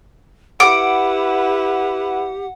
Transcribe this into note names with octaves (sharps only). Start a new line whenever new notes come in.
E4 G4 B4 F#5 D6